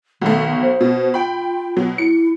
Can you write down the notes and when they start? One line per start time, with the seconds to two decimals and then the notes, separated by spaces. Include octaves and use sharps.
0.21 B1 B2 D#3 A3
0.62 C5
0.81 B2
1.14 F4 G5 B5
1.76 B2 F#3
1.98 E4 C#7